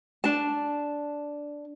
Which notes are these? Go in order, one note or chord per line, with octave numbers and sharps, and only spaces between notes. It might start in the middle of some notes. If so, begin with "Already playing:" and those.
D4 A5